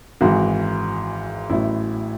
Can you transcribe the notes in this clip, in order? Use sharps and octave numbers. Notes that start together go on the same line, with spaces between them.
G#1 G#2 E3 F#4
A1 A2 F#3 E4